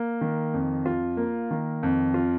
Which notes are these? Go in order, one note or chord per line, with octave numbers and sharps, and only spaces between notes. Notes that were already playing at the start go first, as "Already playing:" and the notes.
Already playing: A#3
D#3
F2
F4
A#3
D#3
F2
F4